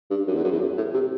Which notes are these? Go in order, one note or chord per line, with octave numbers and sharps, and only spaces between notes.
G2
F#2
E2
F#2
E2
F#2
A2
C3